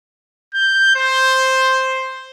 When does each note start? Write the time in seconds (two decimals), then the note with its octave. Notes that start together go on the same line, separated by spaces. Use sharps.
0.54 G6
0.96 C5